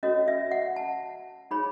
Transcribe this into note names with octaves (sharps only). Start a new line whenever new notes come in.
C#4 F#4 A4 C#5 D#5
E5
F#5
A5
D#4 G#4 C#5 B5